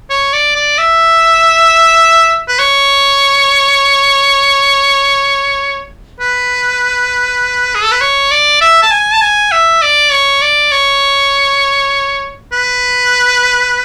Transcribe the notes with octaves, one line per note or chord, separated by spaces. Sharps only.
C#5
D5
D5
E5
B4
C#5
B4
G#4
A4
B4
C#5
D5
E5
A5
G#5
A5
G#5
E5
D5
C#5
D5
C#5
B4